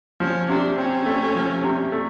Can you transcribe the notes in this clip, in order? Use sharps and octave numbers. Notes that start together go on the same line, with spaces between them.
F3 C#4
C3 D4
C4 C#4
A3
F3
C3
A3